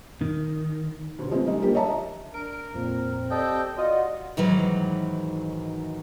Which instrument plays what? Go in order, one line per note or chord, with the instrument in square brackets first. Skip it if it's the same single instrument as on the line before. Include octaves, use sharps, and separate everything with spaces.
[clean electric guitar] D#3
[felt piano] F1 D2
C#3 F3 G#3 A3 B3 C4
G3 G#3 D#4
D3 F3 G3 A#3 G4
C#5 D#5 E5 A5 A#5
D#5
[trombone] D4 [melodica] A#4 [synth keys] D7
[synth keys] F2 A#2 [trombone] C4
[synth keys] G4 D5 G6 [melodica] A4 D#5 G5
[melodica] F4 [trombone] F#4 [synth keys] D5 D#5 F#5
[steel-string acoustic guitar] G#2 D#3 E3 F#3